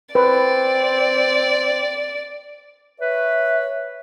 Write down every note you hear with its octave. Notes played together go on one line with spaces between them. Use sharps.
C4 B4 D5
B4 C#5 E5